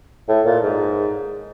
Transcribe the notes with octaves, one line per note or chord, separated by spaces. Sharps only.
A2
A#2
G#2